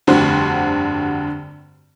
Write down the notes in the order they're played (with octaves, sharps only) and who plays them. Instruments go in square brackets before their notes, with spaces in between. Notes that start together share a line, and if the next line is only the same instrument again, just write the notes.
[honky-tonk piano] F1 G2 D3 F#4 C5